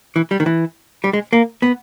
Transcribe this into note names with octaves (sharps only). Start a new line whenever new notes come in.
E3
G3
D#3
E3
G3
G#3
A#3
B3